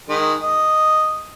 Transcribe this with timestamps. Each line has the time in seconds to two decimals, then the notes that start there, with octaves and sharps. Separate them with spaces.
0.09 D#3 G#3
0.43 D#5